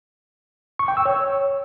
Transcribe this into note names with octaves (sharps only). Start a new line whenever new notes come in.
C#6
G5
E6
C#5